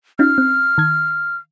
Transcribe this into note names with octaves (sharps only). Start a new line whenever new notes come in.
C#4 D#4 F4 F6
C4
D#3 G#6